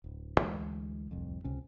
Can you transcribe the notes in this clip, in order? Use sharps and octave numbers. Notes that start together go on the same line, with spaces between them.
D1
D2 E3 G#3
D1 C2 F2
C#2 C3 C#4